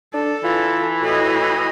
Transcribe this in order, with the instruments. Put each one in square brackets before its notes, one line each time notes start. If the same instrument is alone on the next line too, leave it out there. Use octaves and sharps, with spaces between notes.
[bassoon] D4 [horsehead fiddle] A4
[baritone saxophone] E3 [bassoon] F4
[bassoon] A2 [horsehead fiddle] F#4 D#5